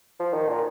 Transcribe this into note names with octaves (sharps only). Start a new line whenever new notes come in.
F3
D#3
A#2